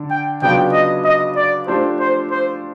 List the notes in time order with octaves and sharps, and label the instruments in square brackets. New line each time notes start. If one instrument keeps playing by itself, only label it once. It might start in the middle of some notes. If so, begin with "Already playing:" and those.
Already playing: [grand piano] D3 D4
[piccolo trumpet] G5
[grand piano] C#3 F#3 B3 D4 F4 [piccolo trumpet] G5
[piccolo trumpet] D#5
D#5
D5
[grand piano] F3 A3 D4 G4 [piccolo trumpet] C5
[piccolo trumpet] C5
C5